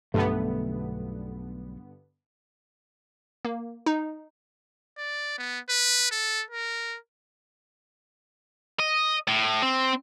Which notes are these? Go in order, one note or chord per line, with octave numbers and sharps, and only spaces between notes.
B1 G2 D3 A3 B3
A#3
D#4
D5
B3
B4
A4
A#4
D#5
A2
C4